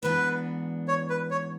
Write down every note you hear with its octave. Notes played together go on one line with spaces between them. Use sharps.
G#2 E3 B3 D4 B4
C#5
B4
C#5